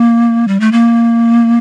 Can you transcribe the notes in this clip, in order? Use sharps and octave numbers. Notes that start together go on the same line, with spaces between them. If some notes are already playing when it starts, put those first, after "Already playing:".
Already playing: A#3
G3
A3
A#3